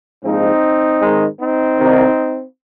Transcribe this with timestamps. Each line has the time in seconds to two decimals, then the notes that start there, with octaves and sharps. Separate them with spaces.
0.24 A#1 G#2 F3 G#3 C4 D#4
1.01 G#2 D#3 G#3
1.39 C4 D#4
1.78 C2 C3 D#3